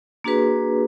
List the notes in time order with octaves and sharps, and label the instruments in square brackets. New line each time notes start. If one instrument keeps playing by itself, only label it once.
[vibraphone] A#3 D4 F#4 G#4 B4